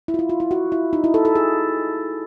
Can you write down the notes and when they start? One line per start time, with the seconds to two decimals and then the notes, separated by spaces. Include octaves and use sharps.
0.08 E4
0.14 F4
0.19 E4
0.29 F4
0.40 E4
0.51 F#4
0.72 E4
0.93 D#4
1.04 E4
1.14 A4
1.25 A4
1.35 G#4